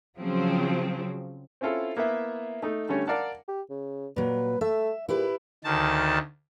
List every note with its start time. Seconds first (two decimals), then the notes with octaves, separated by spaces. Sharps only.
0.17 C#3 F3 F#3 C4
1.61 C4 C#4 E4 F4 A4
1.97 A#3 B3 E4 E5
2.62 A3 D#4 A4
2.89 D3 G3 A3 C#4 C#5
3.07 A#4 D5 F5 F#5 A5
3.48 G4
3.70 C#3
4.16 A#2 F#3 B4
4.61 A3 E5
5.09 A#2 E4 G4 B4
5.64 D2 D#3 A5